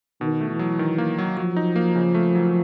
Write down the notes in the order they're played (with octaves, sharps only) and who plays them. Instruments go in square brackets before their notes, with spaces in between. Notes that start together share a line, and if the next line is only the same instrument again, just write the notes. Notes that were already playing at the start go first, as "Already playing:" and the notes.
[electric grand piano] B2 [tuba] D#3
[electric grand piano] A3
[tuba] E3
[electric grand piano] F#3
D#3
A#3
F#3
[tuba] F3 [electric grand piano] F#3
[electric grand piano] D#4
A#3
C#3
A3
F#3